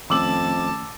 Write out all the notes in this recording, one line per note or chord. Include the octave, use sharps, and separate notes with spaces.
F2 D#3 A3 C#4 A5 D6 E6 F#7